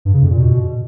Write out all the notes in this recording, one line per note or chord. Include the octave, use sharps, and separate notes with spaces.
G2
C#3
F2
A#2
B2